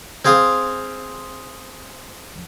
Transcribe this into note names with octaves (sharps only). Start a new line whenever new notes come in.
C4 G#4 F5 C6 D#6